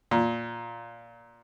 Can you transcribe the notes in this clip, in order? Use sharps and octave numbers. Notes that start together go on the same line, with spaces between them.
A#2